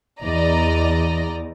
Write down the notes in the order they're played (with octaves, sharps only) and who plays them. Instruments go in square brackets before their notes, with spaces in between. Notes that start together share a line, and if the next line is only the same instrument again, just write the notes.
[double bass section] E2 [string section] D5 D#5 A#5